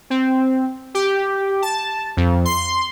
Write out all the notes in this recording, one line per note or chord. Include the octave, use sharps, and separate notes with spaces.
C4
G4
A5
F2
C6